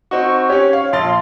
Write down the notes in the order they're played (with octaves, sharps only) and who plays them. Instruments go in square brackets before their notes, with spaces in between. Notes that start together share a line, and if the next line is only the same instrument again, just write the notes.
[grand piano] C4 D#4 F#4 [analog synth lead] C#6
[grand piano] C#4 G4 [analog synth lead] C#5
[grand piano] F5
[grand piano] A#1 F5 A6 [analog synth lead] C6